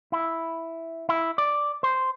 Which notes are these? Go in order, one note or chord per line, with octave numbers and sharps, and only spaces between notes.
E4
E4
D5
C5